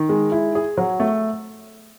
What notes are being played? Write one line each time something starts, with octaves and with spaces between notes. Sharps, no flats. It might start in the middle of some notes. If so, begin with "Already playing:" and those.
Already playing: D#3
G#3
E4
G#4
F#3
A3